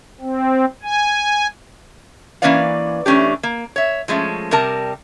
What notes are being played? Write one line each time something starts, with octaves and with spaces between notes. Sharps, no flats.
C4
G#5
E3 A#3 C#4 B4 D5 F5
E3 A3 C#4 D4 G4
A#3
C#5 E5
F3 G#3 A3 C#4
C3 G3 A#4 A5